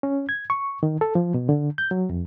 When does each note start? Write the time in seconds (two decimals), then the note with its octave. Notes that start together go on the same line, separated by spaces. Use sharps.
0.03 C#4
0.29 G#6
0.50 C#6
0.83 D#3
1.01 A4
1.15 F3
1.34 B2
1.49 D3
1.78 G6
1.91 F#3
2.10 F2